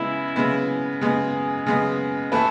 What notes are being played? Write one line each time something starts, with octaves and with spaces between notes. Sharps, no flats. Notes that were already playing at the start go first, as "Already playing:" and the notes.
Already playing: C#3 G#3 B3 E4
C#3 G#3 B3
C#3 G#3 B3 G#4
C#3 G#3 B3
E3 A3 E4 A4 B4